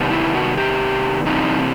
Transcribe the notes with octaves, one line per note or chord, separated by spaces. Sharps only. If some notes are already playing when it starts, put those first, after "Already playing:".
Already playing: C3 D#3 G3 B3
E4
F#4
G4
C3 E3 G3 C4 D#4